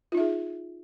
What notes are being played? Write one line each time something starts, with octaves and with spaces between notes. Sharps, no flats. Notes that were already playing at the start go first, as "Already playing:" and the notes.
D#4 F4 G#4 E5